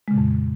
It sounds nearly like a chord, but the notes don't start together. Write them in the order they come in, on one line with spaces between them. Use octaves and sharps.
G#3 C#3 A#2 F2